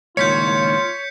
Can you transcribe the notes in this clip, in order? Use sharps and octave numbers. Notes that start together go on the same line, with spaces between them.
C#2 A#2 D#3 F4 C#5 G6 B6 C#7